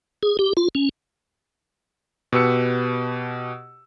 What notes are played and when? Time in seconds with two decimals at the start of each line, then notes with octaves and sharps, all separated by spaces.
0.23 G#4
0.39 G4
0.57 F4
0.75 C#4
2.32 B2 G4 B4 E6 C#7